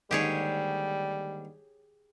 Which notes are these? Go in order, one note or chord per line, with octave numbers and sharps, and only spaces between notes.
D#2 G#2 D3 G3 G4 G#4 C#5